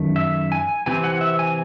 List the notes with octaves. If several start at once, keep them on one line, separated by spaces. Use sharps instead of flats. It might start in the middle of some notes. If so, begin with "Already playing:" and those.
Already playing: F#2 D#3 A3
E5
G#5
C3 E3 C4 G#5
F#5
E5
G#5